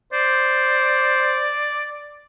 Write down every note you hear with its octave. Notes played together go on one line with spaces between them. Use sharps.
C5 D5